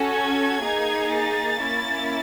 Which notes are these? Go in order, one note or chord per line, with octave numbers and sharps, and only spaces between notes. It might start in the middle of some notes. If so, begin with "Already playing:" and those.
Already playing: C#4 F#4 A4
G#6
A#3 D#4 G#4
A6
A#3 C#4 E4